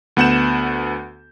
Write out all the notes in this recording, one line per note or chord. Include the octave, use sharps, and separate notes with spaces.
D2 B3 F#5 G6 E7